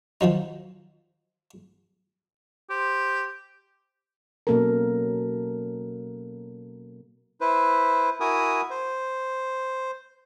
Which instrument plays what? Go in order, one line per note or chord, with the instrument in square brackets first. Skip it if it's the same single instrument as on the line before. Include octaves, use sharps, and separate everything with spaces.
[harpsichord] D#3 F3 F#3 D#4
[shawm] G4 [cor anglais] C5
[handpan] B2 F#3 A#3 C#4 A4 A#4
[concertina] E4 B4 C5
E4 F#4 A#4 G#5 D#6
C5